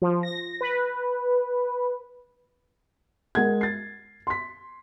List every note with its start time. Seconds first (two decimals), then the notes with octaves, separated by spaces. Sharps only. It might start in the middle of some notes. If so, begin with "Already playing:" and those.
0.02 F3
0.23 A#6
0.61 B4
3.35 G#3 A#4 F#5 G#6
3.61 A6 C7
4.27 C6 B6